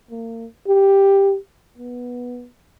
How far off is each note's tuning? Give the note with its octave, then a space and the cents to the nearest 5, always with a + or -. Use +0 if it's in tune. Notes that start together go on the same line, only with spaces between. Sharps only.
A#3 -35
G4 +5
B3 -10